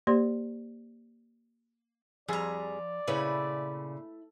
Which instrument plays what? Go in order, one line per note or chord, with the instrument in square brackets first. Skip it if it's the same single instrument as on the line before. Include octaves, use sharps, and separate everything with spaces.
[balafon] A#3 G4 C5 D5 C6
[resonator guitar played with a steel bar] F2 G3 G#4 [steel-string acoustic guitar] F3 A#5 [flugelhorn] D5
[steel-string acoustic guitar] A#2 C#3 G#5 [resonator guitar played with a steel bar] A3 [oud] E4 B4 C#5